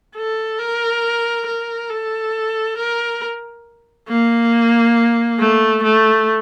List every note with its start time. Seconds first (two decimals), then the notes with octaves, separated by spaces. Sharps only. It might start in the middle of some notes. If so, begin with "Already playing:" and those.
0.16 A4
0.59 A#4
1.47 A#4
1.90 A4
2.78 A#4
4.09 A#3
5.40 A3
5.83 A3